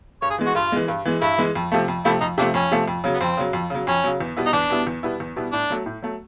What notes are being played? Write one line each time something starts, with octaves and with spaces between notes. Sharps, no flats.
G2 C#5
G#4
E3 G#3
F#4
G2 F4
E3 G#3
G2
E3 G#3
G2 E4
E3 G#3
F2
C3 F3 A3
F2
C3 F3 A3 E4
F2 D#4
C3 F3 A3 D4
F2 C#4
C3 F3 A3
F2
C#3 F#3
B3
F2 C4
C#3 F#3
F2
C#3 F#3
F2 C#4
C#3 F#3
E2
B2 G3 B3 E4
D#4
E2 D4
B2 G3 B3 E4
E2
B2 G3 B3 E4
E2
B2 G3 B3 E4
A2 D4
F#3 A3
A2
F#3 A3